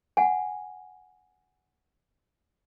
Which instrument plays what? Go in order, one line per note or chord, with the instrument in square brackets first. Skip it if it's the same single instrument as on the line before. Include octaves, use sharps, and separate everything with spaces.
[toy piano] F#5 G#5